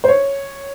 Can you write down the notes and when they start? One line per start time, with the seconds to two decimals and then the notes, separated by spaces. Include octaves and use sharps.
0.04 C5
0.08 C#5